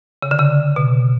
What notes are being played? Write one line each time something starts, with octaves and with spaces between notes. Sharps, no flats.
C#3
D3
C#3
B2